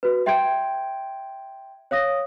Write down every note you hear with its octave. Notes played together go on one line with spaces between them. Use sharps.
F#4 B4
E5 G5 C6 G6 G#6 D7
C#5 F5 D#6 A#6